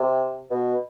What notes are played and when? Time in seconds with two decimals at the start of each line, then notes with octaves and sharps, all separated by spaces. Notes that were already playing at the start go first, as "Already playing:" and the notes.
Already playing: C3
0.51 B2